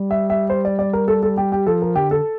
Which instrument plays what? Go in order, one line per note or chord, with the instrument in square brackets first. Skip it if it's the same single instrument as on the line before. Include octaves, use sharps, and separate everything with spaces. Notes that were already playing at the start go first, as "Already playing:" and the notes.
Already playing: [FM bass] G3
[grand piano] E5
E5
C5
D5
D5
A#4
A4
A4
G4
G4
[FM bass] F3 [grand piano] A4
[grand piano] A#4
[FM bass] D3 [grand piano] G4
[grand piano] A4